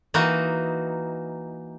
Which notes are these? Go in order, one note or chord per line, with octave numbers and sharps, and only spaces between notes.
E3 A#3 D#4 F#4